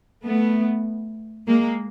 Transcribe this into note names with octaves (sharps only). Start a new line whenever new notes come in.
A3 B3
G#3 A#3